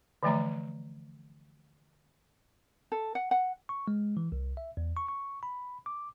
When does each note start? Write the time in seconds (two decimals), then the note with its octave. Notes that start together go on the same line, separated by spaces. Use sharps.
0.23 D3 E3 F3 A3 E5 A#5
2.92 A4
3.15 F#5
3.31 F#5
3.69 C#6
3.88 G#3
4.17 E3
4.32 C2
4.57 E5
4.77 E2
4.97 C#6
5.08 C#6
5.43 B5
5.86 D6